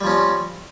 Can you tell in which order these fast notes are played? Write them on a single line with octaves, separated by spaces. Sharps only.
G3 F3 C#4 C4